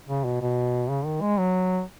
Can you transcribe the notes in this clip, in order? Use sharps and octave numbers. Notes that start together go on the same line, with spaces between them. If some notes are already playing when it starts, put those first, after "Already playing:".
C#3
B2
B2
C#3
D#3
G#3
F#3